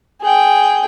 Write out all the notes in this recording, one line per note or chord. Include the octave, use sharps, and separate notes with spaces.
G#4 G5